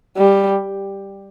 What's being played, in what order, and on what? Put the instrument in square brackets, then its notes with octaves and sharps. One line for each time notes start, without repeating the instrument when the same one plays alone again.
[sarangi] G3